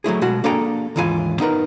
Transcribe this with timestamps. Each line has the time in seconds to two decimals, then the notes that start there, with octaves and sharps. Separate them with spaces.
0.04 F#3 A3 E4 G#4
0.22 B2 G#3 F#4
0.44 A#3 D4 G#4 A4 G5 A#5
0.96 D#2 G#2 E3 F4 G#5
1.40 B3 D#4 A#4 B4